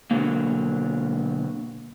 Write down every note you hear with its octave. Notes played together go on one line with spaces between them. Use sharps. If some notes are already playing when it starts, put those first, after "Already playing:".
B2 D3 D#3 F#3 A#3